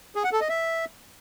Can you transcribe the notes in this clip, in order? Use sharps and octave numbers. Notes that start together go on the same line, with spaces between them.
G#4
F#5
A4
D#5
E5